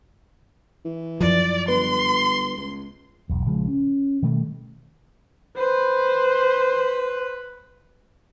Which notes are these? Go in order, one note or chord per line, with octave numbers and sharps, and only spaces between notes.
E3
F#2 F3 D5
G1 B4 C6
C#2
E1 B1
A#1 C#3 F3 G#3
C#4
B2 D#3 G3 A3
B4 C5